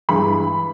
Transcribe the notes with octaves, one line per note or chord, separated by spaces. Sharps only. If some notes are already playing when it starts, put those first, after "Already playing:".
G2 E3 G#3 B5